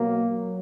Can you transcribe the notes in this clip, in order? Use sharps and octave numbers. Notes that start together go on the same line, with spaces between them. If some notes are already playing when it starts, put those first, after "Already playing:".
Already playing: B2 F#3 A#3
F#3